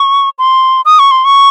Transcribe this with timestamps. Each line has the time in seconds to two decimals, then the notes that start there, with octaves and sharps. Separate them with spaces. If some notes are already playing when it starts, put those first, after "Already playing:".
Already playing: C#6
0.39 C6
0.85 D#6
0.99 C#6
1.11 C6
1.25 C#6